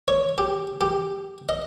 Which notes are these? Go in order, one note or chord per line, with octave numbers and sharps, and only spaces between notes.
C#5
G4
G4
D#5